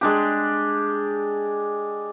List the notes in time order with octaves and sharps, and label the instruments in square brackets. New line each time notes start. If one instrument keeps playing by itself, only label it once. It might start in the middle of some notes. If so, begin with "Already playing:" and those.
[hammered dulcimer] G#3 D4 G4